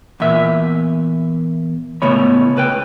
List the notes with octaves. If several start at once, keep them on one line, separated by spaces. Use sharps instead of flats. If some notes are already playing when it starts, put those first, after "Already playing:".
E2 A#2 E5
C#2 A2 C#3 B3 C#5 B5
C#2 B4 G5